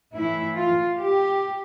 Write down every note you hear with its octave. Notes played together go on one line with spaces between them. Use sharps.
A2 E3 E4
F4
G4